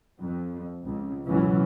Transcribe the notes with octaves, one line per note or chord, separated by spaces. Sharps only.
F2
C#2
G#1 C#2 B2 E3 F#3 C#4